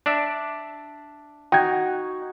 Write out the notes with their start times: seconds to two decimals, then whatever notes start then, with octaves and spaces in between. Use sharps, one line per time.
0.06 D4 D5 E5
1.52 D#4 F#4 G5 G#6